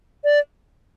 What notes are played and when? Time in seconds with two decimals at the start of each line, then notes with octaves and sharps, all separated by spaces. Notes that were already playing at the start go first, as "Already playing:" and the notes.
0.24 D5